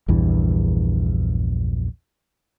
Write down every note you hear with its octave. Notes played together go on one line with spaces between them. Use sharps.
A#1 E2 G2 E3